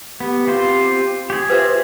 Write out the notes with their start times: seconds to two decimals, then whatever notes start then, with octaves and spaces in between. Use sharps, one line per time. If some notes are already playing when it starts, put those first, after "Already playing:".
0.20 B3 G4
0.47 C4 F4 C5
1.30 G4 G#4
1.50 F4 B4 C5 E5